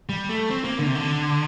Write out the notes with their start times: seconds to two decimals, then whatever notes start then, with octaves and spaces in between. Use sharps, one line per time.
0.09 G3
0.29 A3
0.50 C4
0.64 A#3
0.79 D3
0.87 C3
0.95 D3